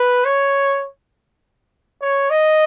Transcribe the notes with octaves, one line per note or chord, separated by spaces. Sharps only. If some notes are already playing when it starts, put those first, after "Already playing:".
Already playing: B4
C#5
C#5
D#5